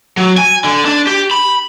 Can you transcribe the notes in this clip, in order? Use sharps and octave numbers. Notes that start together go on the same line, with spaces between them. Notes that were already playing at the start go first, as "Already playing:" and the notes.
F#3
G#5
D3
D4
G4
B5